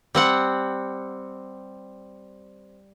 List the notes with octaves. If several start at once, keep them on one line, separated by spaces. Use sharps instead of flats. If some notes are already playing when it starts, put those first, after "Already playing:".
G3 C4 F#5